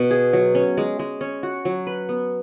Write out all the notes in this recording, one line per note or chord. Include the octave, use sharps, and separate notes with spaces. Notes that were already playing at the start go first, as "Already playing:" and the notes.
Already playing: B2
G#4
F#3
C#4
G#3
G#3
C#4
F#4
F#3
B4
B3